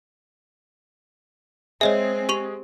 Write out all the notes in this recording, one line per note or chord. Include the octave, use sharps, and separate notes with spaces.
G#3 C4 G#4 C#5 D#5 E5
G4 C#6 F7